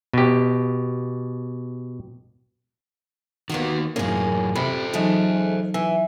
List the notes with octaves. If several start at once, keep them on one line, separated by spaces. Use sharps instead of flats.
B2 G4
D#3 A#3 B3 F4 F#4
F#2 A2 A#3 C#4 G#4
C3 A4 C5 B5
C#3 E3 F#3 G#3 A3 D#4
E3 G#5 E6